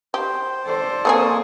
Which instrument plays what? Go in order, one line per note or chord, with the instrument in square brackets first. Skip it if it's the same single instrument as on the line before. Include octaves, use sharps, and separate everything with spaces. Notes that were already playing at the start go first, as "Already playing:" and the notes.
[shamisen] G4 [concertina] C5
[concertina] A4 [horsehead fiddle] C5 D5
[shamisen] A3 C4 G#4 [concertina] A#3 C#6 D#6